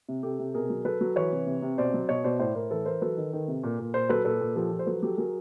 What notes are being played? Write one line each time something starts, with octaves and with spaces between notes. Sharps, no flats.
C3
C3 G4 A4
C3
B2 G#4 A#4
F#3
F#3 A4 B4
F#3
E3 B4 C#5
C3
C3
C3
B2 C5 D5
F#3
B2 C#5 D#5
B2 C5 D5
A2 C5 D5
A2 A#4 C5
E3 A4 B4
E3 A#4 C5
F#3 A4 B4
D#3
D#3
C3
A#2
A#2
A#2 A#4 C5
F#3 A4 B4
A#2 A4 B4
A#2
F3 G4 A4
F3
C5
F#3 A4 B4
F#3 G4 A4
F#3 G#4 A#4